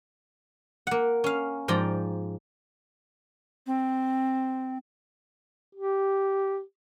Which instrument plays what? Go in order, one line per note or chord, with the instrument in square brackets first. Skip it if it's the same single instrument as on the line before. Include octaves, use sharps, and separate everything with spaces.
[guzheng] A#3 F#5
C#4 F5
G#2 F3 D5 G5 A#5
[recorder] C4
[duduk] G4